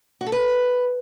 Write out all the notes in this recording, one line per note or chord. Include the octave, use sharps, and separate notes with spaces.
F#4
A4
B4